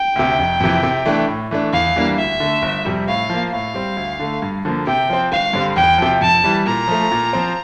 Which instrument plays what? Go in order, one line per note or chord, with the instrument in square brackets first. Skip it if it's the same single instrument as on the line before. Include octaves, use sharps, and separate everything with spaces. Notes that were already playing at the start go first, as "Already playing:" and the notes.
Already playing: [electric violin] G5
[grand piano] D2 C3
F1
F2 C3 E3
C3
E3 A3 D4
A2
E3 A3 D4
[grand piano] E2 [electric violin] F5
[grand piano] E3 G3 A#3 D4
[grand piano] D2 [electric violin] E5
[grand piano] D3 A3
G1
F2 C3 G3
[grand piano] A2 [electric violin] F5
[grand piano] F3 A#3
[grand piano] A2 [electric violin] F5
[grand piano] G3 C4
D2
D3 A3
G2
D3 F3 A#3
[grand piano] C3 [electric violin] G5
[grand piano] F3 C4
[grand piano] G1 [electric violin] F5
[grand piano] G2 D3 G3 C4
[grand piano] E2 [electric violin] G5
[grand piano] C3 F3
[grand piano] F2 [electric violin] A5
[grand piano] E3 G3
[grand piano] A#2 [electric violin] A#5
[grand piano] F3 A3
A#2
F3 C4